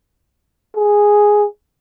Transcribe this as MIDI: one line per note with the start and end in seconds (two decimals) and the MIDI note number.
0.76 1.45 68